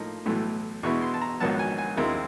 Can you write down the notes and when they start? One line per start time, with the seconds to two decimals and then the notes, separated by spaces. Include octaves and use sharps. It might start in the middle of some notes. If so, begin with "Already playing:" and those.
Already playing: A2 F3 A#3 D#4
0.26 B1 A2 E3 A3
0.83 E2 B2 G#3 B3 E4 C#6
1.02 C6
1.14 A5
1.21 A#5
1.40 A#1 G#2 D#3 F#3 B3 A5
1.59 G#5
1.78 G#5
1.97 D#2 D#3 G#3 C4 E4